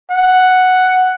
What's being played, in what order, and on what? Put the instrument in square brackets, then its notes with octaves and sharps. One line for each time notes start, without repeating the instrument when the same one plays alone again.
[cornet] F#5